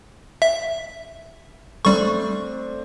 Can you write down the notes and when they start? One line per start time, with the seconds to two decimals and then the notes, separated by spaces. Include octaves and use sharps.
0.42 E5
1.85 G3 A3 C4 D4 C#6